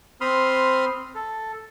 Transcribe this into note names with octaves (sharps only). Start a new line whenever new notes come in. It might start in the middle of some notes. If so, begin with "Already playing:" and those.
C4 B5 C6 D#6 F6
A4